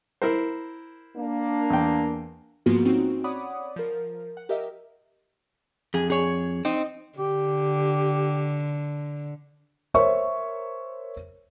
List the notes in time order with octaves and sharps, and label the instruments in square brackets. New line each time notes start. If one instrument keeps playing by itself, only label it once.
[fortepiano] E4 A#4 C5
[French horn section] A#3 D4
[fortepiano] E2 G5
[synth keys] G#2 F3 A#3 B3 F4 F#4
C4 C#4 D#4 F#4
C#5 D5 F#5 B5 D6 D#6
F3 A#4
F#5
G4 A#4 D#5 E5
[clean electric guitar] F2 [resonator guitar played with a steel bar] G#4
[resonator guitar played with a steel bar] G#4 C#5
[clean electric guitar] C4 [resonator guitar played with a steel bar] D#4
[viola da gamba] D3 [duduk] G4
[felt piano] A#4 C5 C#5 E5 C#6